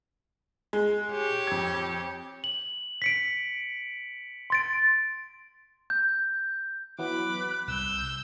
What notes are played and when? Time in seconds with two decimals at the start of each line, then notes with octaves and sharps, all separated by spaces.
0.73 G#3
1.11 G4 C#5
1.47 F2 G#6
2.44 F#7
3.02 B6 C#7 D7
4.50 C6 A6 D7
5.90 G6
6.99 E3 F#3 B3 B5 D6 F#6
7.68 C2 E6 G6